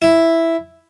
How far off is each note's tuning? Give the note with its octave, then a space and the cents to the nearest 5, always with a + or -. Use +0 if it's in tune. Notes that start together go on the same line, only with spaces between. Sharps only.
E4 +0